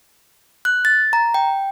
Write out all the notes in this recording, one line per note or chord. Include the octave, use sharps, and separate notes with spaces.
F#6
A6
A#5
G5